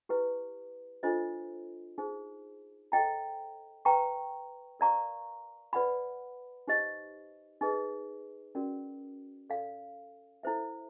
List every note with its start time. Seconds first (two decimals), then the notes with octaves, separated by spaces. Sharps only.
0.09 E4 G4 B4
1.03 D4 F4 A4 C5 D#5
1.98 D#4 G#4 C5
2.92 A4 C5 D#5 G5 A#5
3.85 B4 D5 G5 A#5 C#6
4.80 A#4 D5 F5 A#5 C#6
5.73 B4 D5 F#5 B5
6.67 D#4 G4 C5 D#5
7.61 D#4 G#4 B4 D#5
8.55 C#4 F#4 A#4 D5
9.50 A4 D5 F5
10.43 E4 A4 C5 E5